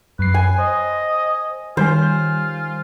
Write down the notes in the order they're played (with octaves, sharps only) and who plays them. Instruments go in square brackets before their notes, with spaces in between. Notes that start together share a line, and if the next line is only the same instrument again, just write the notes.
[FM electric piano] F#2 C7 [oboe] B4
[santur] G#5
[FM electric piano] C5 [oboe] D#5
[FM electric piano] D#3 G3 G#5 [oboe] F4 [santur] C5